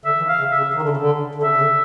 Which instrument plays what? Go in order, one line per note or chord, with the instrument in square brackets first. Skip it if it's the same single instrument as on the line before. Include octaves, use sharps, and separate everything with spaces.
[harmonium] D3 [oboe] E5
[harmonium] E3
D#3
[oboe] F5
[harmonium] C#3
[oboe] E5
[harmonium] C#3
D#3
D3
C#3
D3
D3
[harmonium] C#3 [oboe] E5
[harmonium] C#3
D3